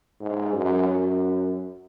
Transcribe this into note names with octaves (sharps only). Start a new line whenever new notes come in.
G#2
F#2
F#2